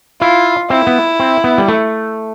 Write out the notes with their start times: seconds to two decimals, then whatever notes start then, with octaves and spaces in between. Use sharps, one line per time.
0.21 E4 F4
0.70 C4 E4
0.87 B3
1.20 C4
1.44 B3
1.58 G3
1.68 A3